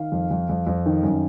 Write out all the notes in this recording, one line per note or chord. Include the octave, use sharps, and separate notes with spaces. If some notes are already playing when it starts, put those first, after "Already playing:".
Already playing: D#3 F5
F2
F2
F2
F2
D#3
F#2